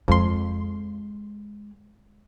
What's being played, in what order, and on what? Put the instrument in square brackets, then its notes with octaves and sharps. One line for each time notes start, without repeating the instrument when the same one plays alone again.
[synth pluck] F2 C6 [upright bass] G#3